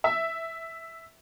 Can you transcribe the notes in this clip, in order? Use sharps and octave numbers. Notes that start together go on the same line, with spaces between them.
E5